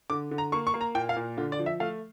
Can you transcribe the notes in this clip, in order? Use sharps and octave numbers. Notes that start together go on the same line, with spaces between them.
D3 D6
D3
A#5
A#3 C#6
C#6
A#3
A#5
A#2 G5
F5
A#2
D3 F4
D5
F3
E5
A3 F5